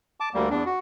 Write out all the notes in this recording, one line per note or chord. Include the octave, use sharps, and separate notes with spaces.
A5 D6
D2 G3 A#3
E2 D4
F#4